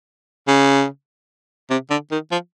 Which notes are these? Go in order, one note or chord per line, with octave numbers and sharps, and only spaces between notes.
C#3
C3
D3
D#3
F3